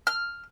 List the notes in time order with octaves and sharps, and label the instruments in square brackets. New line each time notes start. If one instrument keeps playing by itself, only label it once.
[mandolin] F6